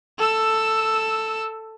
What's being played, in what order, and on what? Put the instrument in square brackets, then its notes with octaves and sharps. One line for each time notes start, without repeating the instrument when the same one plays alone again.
[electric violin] A4 E6